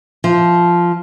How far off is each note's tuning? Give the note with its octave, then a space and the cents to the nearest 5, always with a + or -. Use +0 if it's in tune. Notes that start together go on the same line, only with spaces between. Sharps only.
F3 -5